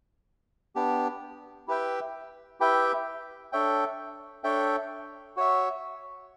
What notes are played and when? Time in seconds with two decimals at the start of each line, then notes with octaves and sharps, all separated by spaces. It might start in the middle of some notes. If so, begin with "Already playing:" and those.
0.75 B3 D4 G4
1.68 E4 G4 B4 E5 G5
2.60 E4 G4 B4 E5 G5
3.52 D4 A4 C#5 E5 G5
4.44 D4 A4 C#5 E5 G5
5.37 F#4 C#5 E5